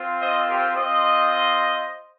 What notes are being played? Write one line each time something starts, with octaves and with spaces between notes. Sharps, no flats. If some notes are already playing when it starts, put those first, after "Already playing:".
Already playing: C4 F4
C5 D#5
G4 A#4
C4 F4 C5 D#5